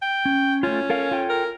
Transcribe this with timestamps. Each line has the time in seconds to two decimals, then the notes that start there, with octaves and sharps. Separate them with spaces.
0.02 G5
0.25 C#4
0.63 A3 C#4 F4
0.90 A4 A#4 F5
1.11 F4 A4 G5
1.29 A#4